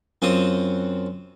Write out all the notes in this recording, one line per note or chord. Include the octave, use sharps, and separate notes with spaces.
F#2 F#3 C4 F4 C5 D#6